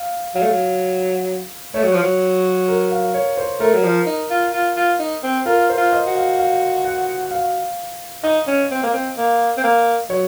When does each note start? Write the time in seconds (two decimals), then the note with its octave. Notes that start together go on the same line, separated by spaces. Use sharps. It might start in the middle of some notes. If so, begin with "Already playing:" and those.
Already playing: F5
0.35 F#3 F5
0.42 A3
0.50 F#3
1.74 A3 C#5
1.84 F#3
1.93 F3
2.03 F#3
2.68 A#4
2.91 F5
3.14 C#5
3.37 C5
3.60 A3 A#4
3.74 F#3
3.84 F3
4.07 D#4
4.30 F4
4.53 F4
4.77 F4
4.99 D#4
5.23 C4
5.46 F4 A#4
5.70 C5
5.77 F4
5.93 D#5
6.07 F#4
6.15 F5
6.39 F5
6.85 F#5
7.31 F5
8.24 D#4 D#5
8.47 C#4
8.71 C4
8.83 A#3
8.93 C4
9.17 A#3
9.57 C4
9.63 A#3
10.10 F#3 C#5